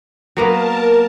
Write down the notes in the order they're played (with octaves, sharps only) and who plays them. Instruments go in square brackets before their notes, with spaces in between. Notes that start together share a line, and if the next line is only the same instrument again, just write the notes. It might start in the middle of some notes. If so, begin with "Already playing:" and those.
[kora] F#3 A#3 B3 [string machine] A#4 A5